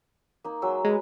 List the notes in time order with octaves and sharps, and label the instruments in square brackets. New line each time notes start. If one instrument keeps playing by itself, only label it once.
[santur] A#3 D#4
F#3 G#3 E6
[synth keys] G#3 [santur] B4 A#5